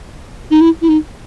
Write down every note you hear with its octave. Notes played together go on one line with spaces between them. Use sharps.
D#4
E4
E4
D#4